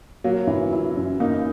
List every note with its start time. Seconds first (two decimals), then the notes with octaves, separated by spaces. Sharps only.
0.24 F#3 A#3
0.47 E3
0.73 E4
0.97 F#2
1.20 A#3 D#4